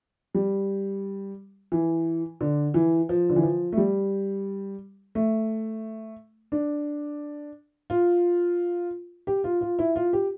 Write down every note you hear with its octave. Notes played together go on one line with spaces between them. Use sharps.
G3
E3
D3
E3
F3
D3
E3
F3
A3
G3
A3
D4
F4
G4
F4
F4
E4
F4
G4